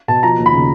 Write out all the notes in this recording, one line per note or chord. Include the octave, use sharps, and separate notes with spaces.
B2 A5
F3 A#5
D#2
B5
C#3